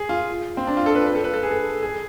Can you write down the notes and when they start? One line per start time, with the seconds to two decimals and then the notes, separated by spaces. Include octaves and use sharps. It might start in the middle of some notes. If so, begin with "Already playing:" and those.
Already playing: G#4
0.09 F4
0.57 C4
0.67 D4
0.77 F4
0.86 A4
0.95 B4
1.06 B4
1.15 A4
1.24 B4
1.34 A4
1.43 G#4
1.51 A4
1.82 G#4